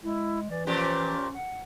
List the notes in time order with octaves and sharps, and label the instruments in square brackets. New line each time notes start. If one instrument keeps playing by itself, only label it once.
[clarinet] G#3 [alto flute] E4
[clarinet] E3 [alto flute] D5
[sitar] A#2 F3 G4 [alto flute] C#4
[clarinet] F#5